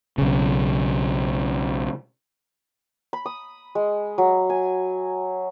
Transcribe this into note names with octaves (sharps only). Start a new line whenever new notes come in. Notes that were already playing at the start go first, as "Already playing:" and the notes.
B1 C#3
B5
D#6
G#3
F#3
G#5